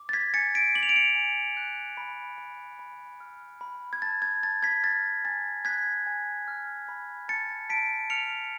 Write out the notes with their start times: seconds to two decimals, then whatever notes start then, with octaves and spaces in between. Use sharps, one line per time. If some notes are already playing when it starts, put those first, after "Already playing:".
Already playing: D6
0.09 A6
0.13 G#6 B6
0.34 G#5 A6 C#7
0.55 B6 D7
0.75 D6 F#7
0.83 F7
0.89 D7
0.96 C#7 F7
1.15 G#5
1.57 F#6
1.97 B5
2.38 B5
2.79 B5
3.20 F6
3.61 B5
3.93 G#6
4.02 A5 A6
4.22 G#6
4.43 A5 A6
4.63 G#6 B6
4.83 F6 A6
5.24 G#5 A6
5.65 F#6 G#6 B6
6.07 G#5
6.48 F6
6.89 B5
7.28 A5 A6 C#7
7.70 A5 B6 D7
8.10 F6 C#7 F7